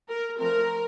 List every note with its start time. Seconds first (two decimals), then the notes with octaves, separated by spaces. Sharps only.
0.09 A#4
0.38 F3 A3 C4 A#4